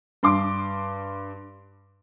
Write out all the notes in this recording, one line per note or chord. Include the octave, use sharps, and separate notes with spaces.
G2 C6 D6